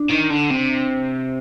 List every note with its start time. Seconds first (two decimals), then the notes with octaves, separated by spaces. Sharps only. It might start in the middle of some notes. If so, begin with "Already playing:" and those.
Already playing: D4
0.10 D#3
0.30 D3
0.50 C3